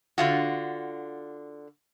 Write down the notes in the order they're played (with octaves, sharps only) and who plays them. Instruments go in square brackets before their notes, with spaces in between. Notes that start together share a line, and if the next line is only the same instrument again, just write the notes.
[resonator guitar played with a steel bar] D3 F4 F#4